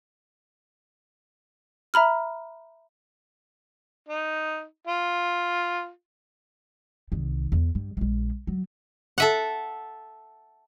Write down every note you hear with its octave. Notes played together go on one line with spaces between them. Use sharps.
E5 A#5 B5 F6
D#4
F4
C2 D#3
E2
G2
A#1 G#3
F#3
A4 E5 F#5